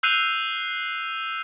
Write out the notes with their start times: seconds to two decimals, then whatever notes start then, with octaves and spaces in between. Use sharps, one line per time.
0.03 E6 F#6 G6 C7 D#7 F7